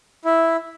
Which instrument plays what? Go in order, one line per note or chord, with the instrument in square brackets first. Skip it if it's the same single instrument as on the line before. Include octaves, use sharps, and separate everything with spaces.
[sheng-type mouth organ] E4